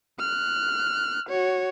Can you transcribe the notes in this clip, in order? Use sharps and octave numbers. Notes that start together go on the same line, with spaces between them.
F6 F#6
F#4 C#5